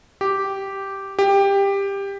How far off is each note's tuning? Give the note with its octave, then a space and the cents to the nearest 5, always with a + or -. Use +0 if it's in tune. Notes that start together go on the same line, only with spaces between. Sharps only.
G4 -5
G4 +15